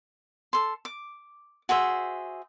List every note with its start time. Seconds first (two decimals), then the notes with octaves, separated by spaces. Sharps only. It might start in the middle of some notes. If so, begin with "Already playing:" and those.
0.53 A4 C6
0.85 D6
1.69 F#4 G#4 C5 E5